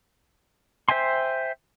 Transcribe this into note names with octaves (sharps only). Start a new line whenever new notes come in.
C5 E5 G5 G#5 C6